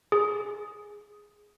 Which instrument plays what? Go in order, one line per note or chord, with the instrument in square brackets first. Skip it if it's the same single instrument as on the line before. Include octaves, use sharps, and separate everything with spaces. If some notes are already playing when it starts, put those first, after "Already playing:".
[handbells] G#4